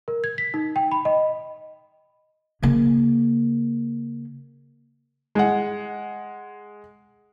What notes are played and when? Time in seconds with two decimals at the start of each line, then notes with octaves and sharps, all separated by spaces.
0.08 A#4
0.24 G#6
0.38 B6
0.54 D#4
0.76 G5
0.92 B5
1.05 D#5
2.62 C#3 A#3
5.35 G#3 F#5